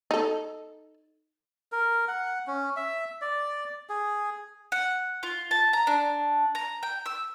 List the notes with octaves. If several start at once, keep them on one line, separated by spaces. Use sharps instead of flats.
D#4 A4
A#4
F#5
C#4
E5
D5
G#4
F#5
F4
A5
A#5
D4
A#5
G5
E6